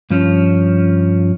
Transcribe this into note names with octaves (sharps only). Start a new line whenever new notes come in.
G2 F3 C#4